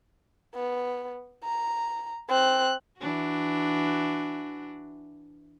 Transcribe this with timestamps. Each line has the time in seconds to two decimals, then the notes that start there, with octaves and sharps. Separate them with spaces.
0.55 B3
1.44 A#5
2.29 C4 F#6
2.99 E3 D4 F#4